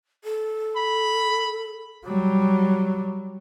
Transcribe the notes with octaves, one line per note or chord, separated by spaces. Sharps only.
A4
B5
F#3 G3